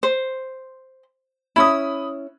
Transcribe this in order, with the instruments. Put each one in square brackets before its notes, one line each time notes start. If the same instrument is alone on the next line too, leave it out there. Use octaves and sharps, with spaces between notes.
[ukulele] C5
[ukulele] C#4 E4 [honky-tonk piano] B5 D#6